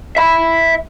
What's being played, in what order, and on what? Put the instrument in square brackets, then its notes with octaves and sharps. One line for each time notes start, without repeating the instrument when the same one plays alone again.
[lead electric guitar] E5 B5